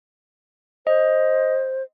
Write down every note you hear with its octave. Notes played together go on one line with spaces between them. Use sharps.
C5 D#5